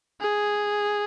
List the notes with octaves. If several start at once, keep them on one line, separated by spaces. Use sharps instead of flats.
G#4